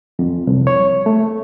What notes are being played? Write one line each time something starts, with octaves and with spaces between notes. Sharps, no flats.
F2
C2
C#5
A3